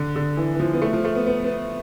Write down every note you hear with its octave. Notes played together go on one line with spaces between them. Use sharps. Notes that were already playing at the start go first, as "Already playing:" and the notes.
Already playing: D3
D3
E3
E3
F3
B3
A3
F3
A3
B3
B3
B3